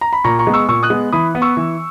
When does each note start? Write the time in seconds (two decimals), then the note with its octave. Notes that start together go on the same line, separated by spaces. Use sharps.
0.01 A#5
0.13 B5
0.24 A#2 A#5 C#6
0.39 A#5 C#6
0.47 G#3 B3
0.54 C#6 E6
0.68 A#2 C#6 E6
0.83 D#6 F#6
0.90 G#3 B3
1.12 E3 B5 D#6
1.35 B3
1.42 C#6 E6
1.57 E3